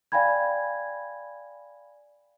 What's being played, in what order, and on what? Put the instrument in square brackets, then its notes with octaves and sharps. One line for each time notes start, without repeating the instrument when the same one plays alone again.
[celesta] D5 F5 G5 G#5 B5 G#6